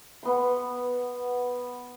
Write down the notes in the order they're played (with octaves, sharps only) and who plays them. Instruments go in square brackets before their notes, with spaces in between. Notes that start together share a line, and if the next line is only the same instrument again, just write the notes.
[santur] B3 C6